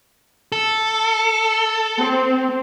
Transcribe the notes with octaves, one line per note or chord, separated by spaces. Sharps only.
A4
C4